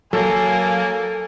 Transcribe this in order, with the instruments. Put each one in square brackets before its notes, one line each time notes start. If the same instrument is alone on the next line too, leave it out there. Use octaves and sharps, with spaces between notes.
[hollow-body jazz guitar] F#3 [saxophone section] A#3 [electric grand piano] A4 [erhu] G#5